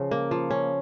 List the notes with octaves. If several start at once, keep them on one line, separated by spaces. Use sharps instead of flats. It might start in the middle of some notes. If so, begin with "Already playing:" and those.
Already playing: C#3 F3 C#4
A#3
F3
C#4